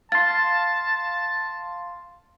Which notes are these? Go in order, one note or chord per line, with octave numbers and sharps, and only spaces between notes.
F5 A5 C6 A6